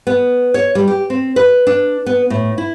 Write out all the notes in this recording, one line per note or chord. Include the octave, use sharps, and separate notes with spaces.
B3
C#5
G3
G4
C4
B4
D4
B3
A2
E4